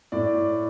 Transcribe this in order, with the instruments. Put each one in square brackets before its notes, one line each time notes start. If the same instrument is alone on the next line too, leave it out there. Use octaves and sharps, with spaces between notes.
[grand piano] A2 D5